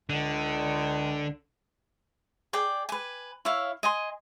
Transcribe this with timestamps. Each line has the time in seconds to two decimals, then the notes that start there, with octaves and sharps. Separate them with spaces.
0.09 C#2 D3
2.53 G#4 D5 G5
2.89 B4 G#5
3.45 E4 C#5 E5 F5
3.83 D#5 G#5 C6